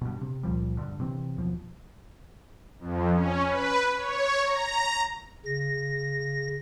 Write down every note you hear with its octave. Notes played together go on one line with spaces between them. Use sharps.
G2 B2
C3
C#2 A#2 F3 G3
G2 D3
C3 E3 C4
D#2 B2 F3
F2
C#4
B4
C#5
A#5
C#3 A#6